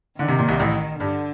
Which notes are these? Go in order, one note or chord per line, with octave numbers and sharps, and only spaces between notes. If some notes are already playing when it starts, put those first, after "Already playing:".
D3 D#3
C3
A#2
C2 C3
A1 A2
G2 D3